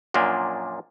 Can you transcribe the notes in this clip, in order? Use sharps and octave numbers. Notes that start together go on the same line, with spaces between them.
F#2 A#2 F3 A#3 D4